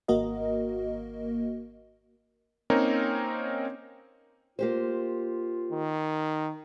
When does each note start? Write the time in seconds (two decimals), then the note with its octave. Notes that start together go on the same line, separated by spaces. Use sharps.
0.08 G#1 A#3 F#4 A#4 D#5
2.70 A#3 C4 C#4 D#4 A#4 C#5
4.59 A#3 F4 G4 C5
5.72 D#3